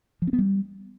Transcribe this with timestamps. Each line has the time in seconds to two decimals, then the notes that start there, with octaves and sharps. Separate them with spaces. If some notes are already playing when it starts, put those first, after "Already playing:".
0.22 F3
0.27 C4
0.33 B3
0.38 G3